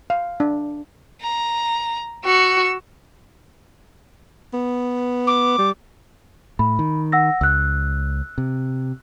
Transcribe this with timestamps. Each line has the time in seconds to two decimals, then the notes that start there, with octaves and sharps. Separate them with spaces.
0.10 F5
0.40 D4
1.21 A#5
2.25 F#4 E6 C#7
4.54 B3
5.27 D6
5.58 G3
6.59 A2 B5
6.79 D#3
7.12 F#5 E6 A#6
7.41 C#2 E6 F#6
8.38 C3